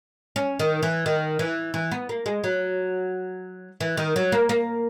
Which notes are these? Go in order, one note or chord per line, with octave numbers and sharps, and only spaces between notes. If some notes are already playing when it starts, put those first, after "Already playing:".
C#4
D#3
E3
D#3
E3
E3
B3
A#3
G#3
F#3
E3
D#3
F#3
A#3
A#3